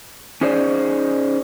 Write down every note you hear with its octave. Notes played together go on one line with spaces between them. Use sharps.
C#4 D#4 G#4 C5 D5